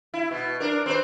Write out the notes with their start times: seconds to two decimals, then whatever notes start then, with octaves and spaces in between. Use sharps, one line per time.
0.14 E4
0.31 B2
0.60 D4 A#4
0.86 C4 B4 C5